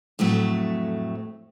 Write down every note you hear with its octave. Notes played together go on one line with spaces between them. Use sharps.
F2 A2 F#3 A3